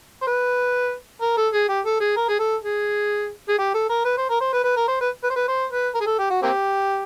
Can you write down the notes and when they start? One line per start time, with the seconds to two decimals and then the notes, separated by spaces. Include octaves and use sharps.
0.22 C5
0.27 B4
1.21 A#4
1.37 A4
1.53 G#4
1.69 G4
1.85 A4
2.00 G#4
2.17 A#4
2.29 G#4
2.39 A4
2.64 G#4
3.48 G#4
3.58 G4
3.74 A4
3.89 A#4
4.05 B4
4.18 C5
4.30 A#4
4.41 C5
4.53 B4
4.64 B4
4.77 A#4
4.88 C5
5.01 B4
5.24 B4
5.30 C5
5.36 B4
5.48 C5
5.72 B4
5.94 A#4
6.00 G#4
6.06 A4
6.19 G4
6.30 F#4
6.43 A#3 C4 G4